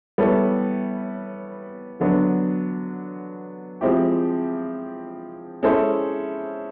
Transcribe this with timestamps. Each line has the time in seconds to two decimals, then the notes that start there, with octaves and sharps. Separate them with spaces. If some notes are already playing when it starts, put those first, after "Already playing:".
0.18 G3 B3 E4 A4 C#5
2.00 D3 F#3 B3 D4
3.81 F3 G#3 C4 E4 G4
5.63 G#3 C#4 E4 A4 C5